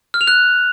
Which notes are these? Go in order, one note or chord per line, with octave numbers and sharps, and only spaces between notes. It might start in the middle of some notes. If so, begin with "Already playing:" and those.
F6
F7
F#6